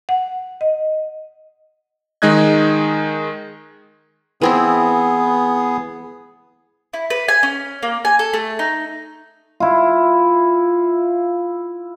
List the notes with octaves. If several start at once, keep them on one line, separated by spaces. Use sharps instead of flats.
F#5
D#5
D#3 G#3 D#4 D#5 F#6 G#6
E3 B3 C4 E4 G#4
E4
B4
G#5
C#4
A#3
G#5
A4
A3
D#4
E4 F4